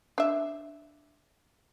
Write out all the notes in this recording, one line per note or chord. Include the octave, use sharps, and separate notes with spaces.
D4 E5